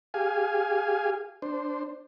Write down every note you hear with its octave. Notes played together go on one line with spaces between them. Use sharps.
G4 G#4 F5 G#5
D4 C5